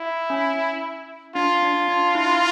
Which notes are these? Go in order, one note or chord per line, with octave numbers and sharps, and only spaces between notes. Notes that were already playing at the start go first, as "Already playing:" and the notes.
Already playing: E4
C#4
D4 F4
D4
D4
E4